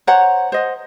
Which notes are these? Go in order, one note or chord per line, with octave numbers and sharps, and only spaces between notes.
C5 C#5 F#5 A#5
C5 D#5 F#5